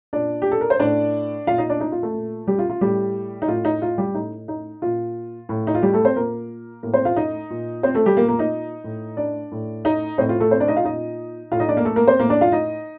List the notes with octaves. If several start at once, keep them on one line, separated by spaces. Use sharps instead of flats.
A#2 D4 D5
G4
A4
A#4
C5
A2 D4 D5
A#2 F4 F5
D#4 D#5
D4 D5
D#4
F4
A3 A4
A#2
G3 G4
F4
F4
A2 G3 G4
D#4
A2 F4
D#4
F4
G3 G4
A2 D#4
D#4
A#2 F4
A2
D#4
F4
G3 G4
A3 A4
C4 C5
A#2 A#3 A#4
A2 A#3 A#4
C4 C5
F4 F5
D#4 D#5
A#2
C4 C5
A3 A4
G3 G4
A#2 A#3 A#4
A#3 A#4
D#4 D#5
A2
D4 D5
A2
D#4 D#5
A2 C4 C5
F4
A3 A4
C4 C5
D4 D5
D#4 D#5
F4 F5
A#2 D#4 D#5
A2 F4 F5
D#4 D#5
D4 D5
A#3 A#4
A3 A4
A#3 A#4
C4 C5
A2 A#3 A#4
D4 D5
F4 F5
D#4 D#5